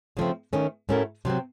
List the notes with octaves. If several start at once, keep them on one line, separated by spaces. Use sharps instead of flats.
C#3 F3 A3 C4
D#3 A3 C#4
A2 A3 C#4 F#4 A#4
C3 F#3 C4